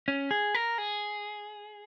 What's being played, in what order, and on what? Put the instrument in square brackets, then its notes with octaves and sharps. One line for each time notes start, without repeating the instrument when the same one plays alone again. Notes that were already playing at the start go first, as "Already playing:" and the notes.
[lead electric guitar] C#4
G#4
A#4
G#4